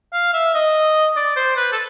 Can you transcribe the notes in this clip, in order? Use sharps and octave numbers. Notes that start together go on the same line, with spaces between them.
F5
E5
D#5
D5
C5
B4
A4